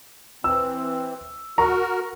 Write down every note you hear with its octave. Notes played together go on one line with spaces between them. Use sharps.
E3 C4 E6
F#4 A#4 A#5 C#6